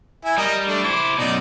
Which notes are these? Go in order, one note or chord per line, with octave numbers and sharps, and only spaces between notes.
E4 G#5
G3 A#4 D#5
A3 D4
E4 C5 D6
F#2 B2 D#4 D5